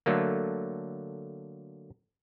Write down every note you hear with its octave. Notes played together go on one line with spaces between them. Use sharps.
D3 F#3 A3 A#3